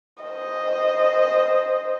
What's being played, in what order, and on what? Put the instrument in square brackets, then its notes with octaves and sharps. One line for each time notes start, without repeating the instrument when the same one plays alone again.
[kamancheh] C5 D#5